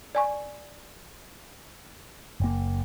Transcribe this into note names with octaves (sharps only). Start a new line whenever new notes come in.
D5 G#5 C#6
F#1 A#3